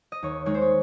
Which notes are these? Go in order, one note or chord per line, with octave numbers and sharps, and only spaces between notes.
D#5
D#2 C#5
D#3 G#3 D#4 C#5
C5
C#5